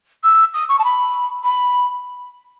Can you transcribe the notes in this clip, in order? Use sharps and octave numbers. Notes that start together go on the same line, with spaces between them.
E6
D#6
C#6
A5
B5
B5